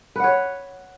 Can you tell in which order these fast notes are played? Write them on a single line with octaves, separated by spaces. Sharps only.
B4 F#5 C#5